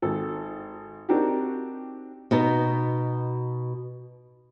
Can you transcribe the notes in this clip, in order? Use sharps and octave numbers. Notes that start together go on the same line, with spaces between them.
G#1 A4
C4 D4 D#4 F#4 G4 A#4
B2 B3 D#4